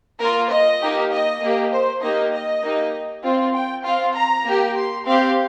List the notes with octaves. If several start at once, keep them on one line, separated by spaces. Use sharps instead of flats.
A#3 F4 A#4
D#5
A#3 D#4 G4
D#5
A#3 G4
C5
A#3 D#4 G4 D#5
D#5
A#3 D#4 G4
C4 F4
G5
C4 F4 F5
A#5
A#3 G4
C6
C4 G4 F5